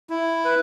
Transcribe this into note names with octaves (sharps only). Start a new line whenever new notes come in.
E4
B4